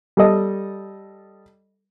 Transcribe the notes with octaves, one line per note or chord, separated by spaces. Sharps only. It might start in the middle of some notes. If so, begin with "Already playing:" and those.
G3 A4 D#5